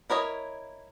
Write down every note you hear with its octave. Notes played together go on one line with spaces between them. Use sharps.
E4 A#4 C#5 D#5